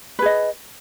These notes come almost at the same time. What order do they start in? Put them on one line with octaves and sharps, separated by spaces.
B4 G#4 D#5